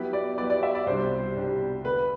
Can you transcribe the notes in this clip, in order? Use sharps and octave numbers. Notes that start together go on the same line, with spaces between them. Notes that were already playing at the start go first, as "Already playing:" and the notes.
Already playing: F#3 B3 E4 G4 B4
D5
F#3 B3 E4 G4 B4 D5
D5
E5
D5
C2 B2 G3 D4 G4 C5
C2 B2 G3 D4 G4
D2 D3 A3 B4